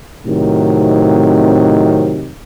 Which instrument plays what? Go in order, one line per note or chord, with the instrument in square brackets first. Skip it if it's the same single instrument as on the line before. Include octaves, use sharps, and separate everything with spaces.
[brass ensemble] A2 C3 D#3 F#3 C4 D#4